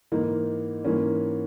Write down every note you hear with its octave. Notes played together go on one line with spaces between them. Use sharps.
G#2 E3 A#3 D#4
G#2 E3 A#3 C#4